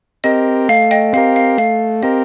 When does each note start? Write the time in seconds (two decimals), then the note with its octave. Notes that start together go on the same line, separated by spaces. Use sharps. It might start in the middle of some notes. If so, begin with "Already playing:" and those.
0.24 C4 G4 A#4 D#5
0.69 A3 F5
0.91 D#5 G5
1.13 C4 G4 A#4 F5
1.36 F5
1.58 A3 F5
2.03 C4 G4 A#4 D#5